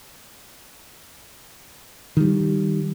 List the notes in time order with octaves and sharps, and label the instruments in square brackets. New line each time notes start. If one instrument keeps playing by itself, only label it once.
[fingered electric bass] D#3 G3